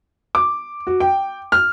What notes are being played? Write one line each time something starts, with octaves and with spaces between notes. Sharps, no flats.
D6
F#4
G5
F6